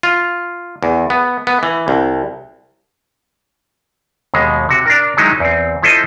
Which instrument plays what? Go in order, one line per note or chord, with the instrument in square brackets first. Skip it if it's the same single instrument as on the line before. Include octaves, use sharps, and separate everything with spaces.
[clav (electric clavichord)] F4
E2
B3
B3
E3
C2
D#2 B2 G#3
C3 F#4
D4 A#4
D#3 F#3 G#3 D#4 E4
E2 C4
F3 E4 A4 C5 D#5